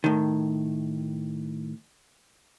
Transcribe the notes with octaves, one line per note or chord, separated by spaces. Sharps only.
A2 D#3